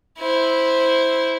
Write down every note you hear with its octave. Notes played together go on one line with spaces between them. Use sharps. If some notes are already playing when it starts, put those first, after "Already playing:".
E4 C5